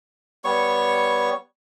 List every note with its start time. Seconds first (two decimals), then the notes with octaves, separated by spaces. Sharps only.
0.44 G3 B3 C#5 C#6